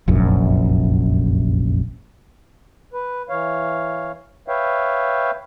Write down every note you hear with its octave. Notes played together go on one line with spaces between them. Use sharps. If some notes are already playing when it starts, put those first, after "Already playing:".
F1 A#1 F#2
B4
E3 C#5 F5
B4 C#5 E5 F5 G5